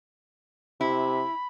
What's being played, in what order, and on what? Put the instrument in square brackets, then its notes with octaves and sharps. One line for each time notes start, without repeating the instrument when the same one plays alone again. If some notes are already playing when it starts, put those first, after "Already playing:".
[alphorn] C3 [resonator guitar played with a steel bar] E4 [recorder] B5